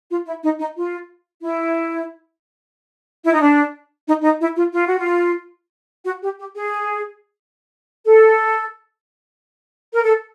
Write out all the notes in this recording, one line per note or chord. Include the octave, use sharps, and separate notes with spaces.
F4
E4
D#4
D#4
F4
E4
E4
D#4
D4
D#4
D#4
E4
F4
F4
F#4
F4
F#4
G4
G4
G#4
A4
A#4
A4